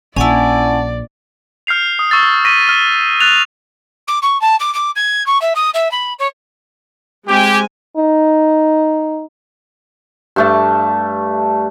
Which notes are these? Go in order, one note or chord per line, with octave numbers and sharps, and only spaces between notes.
A#1 C#4 E4 D5 F#5 G#5 A5
F6 G6 C7 F7
D#6
C#6 E6 A6
C#6 A#6 B6 D#7
F6 G7
F#6 A6 F7
D6
C#6
A5
D6
D6
G#6
C#6
E5
D#6
E5
B5
C#5
G#3 C4 G4 G#5
D#4
G2 A3 A5